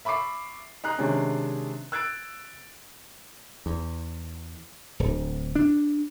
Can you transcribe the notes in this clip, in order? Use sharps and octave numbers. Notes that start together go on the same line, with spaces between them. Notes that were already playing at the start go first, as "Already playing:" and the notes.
E5 B5 C#6 D6 C7
D#4 A#5 F#6 C7
C3 D#3 G#3 C#4 D4
E6 F#6 G#6 A6 D7
E2
D1
D4